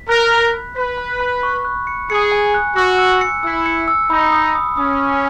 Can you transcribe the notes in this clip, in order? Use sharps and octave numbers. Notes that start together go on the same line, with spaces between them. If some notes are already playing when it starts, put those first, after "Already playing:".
Already playing: B6
A#4 F#6
B6
B5
B4 B6
B5
B5
C#6
F#6
C#7
G#4 C#7
G#5
F#6
F#4 E6
E6
C#7
E4 E6
C#7
E6
D#4 B5
D#6
D#6
C#4 D#6
D#6